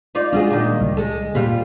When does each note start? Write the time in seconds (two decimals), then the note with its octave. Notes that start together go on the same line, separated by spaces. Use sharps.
0.15 D#4 F4 D5
0.33 G3 G#3 D4 F4 F#4 G#4
0.50 A#2 D#3
0.80 C#2 G3
0.97 G#3 A4
1.35 A#2 G3 A#3 F4